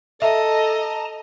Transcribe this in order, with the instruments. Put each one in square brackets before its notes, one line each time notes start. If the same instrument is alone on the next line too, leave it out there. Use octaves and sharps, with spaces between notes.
[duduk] A4 [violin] D#5 [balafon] E5 [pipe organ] A5 A#5